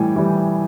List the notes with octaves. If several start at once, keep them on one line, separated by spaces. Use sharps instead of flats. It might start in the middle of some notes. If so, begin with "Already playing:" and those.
Already playing: A2 E3 G3 G5 G#5
E3 G3